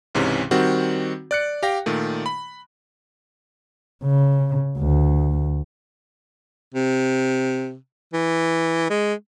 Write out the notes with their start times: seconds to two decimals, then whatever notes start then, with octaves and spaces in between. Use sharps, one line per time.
0.15 C#2 G#2 C3 E3 C#4
0.51 D#3 G3 C4 F#4
1.31 D5 F#6 C#7
1.63 G4 F5 G5 A#6
1.86 A#2 D#3 A3
2.26 B5
4.04 C#3
4.78 D2
6.74 C3
8.13 E3
8.90 G#3